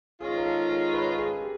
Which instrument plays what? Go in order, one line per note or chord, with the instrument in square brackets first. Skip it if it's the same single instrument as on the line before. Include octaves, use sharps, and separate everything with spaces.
[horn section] G#2 D#3 G#3 C#4 F4 [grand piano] G#4
[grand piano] A#4
A4
A#4
B4
G#4
G4